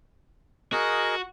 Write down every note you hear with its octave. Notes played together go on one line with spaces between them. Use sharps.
F#4 G#4 A#4 D#5